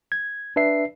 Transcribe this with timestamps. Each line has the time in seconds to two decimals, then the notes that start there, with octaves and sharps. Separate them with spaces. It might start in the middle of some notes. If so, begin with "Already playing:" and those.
0.12 G#6
0.56 D4 B4 E5 C7